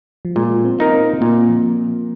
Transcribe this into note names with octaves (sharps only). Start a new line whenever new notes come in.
F3
A#2 G#3
C4
A#3 D#4 A#4
C4
A#2 A#3
F3